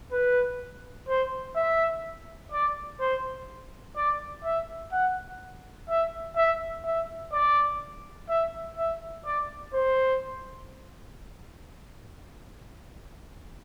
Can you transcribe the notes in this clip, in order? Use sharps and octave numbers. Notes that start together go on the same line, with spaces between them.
B4
C5
E5
D5
C5
D5
E5
F#5
E5
E5
E5
D5
E5
E5
D5
C5